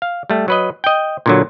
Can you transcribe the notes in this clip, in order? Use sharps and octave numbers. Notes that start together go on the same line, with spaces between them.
F5
G3 A3
F#3 B4 D#5
D#5 G5
A#2 D3 F#3